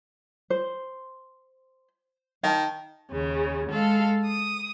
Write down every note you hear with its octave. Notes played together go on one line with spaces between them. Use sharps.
C5
D#3 F5 A5
D#2 C#3
G#3 A4 F5
D#6